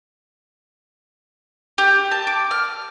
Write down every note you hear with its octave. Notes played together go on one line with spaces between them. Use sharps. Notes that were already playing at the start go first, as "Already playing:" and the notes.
G4
A5
D6
F6